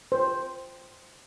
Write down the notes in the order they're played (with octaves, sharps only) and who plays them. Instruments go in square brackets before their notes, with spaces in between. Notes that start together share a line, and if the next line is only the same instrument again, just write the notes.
[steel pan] C5